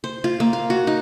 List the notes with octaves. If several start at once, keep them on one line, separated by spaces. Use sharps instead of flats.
C5
F4
A#3
F5
F#4
D#4